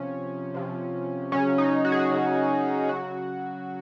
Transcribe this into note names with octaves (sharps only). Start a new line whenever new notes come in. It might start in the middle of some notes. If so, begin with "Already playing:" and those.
Already playing: C3 F3 C#4
C3 F3
C#3 F#3 C#4
D#4
F#4
G#4
F#4
C#3 F#3
C#3 F#3 F#4